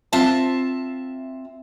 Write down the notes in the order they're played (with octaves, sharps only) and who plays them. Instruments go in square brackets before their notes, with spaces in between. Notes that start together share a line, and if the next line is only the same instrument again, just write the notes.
[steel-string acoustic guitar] C4 F4 E5 A5